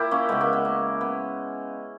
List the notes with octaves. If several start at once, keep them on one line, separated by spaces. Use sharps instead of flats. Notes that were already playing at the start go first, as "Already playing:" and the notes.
Already playing: A#2 E4 G4 A#4
A#3 C#4
C#3 G#3 B3
A#3
B3
A#3
B3